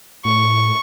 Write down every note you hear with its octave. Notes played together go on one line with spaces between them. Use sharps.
A2 C#6